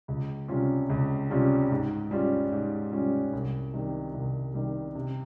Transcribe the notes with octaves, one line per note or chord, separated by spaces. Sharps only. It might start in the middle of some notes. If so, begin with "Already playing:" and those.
C#2
C3 G3 C#4 F4
C#2
C3 G3 C#4 F4
G#2
G3 C#4 F4
G#2
G3 C#4 F4
C2
C3 D#3 G3
C2
C3 D#3 G3
C3